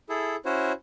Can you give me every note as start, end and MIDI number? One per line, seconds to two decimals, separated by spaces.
0.09 0.36 64
0.09 0.36 68
0.09 0.36 69
0.45 0.72 61
0.45 0.72 64
0.45 0.72 66
0.45 0.72 72
0.45 0.72 73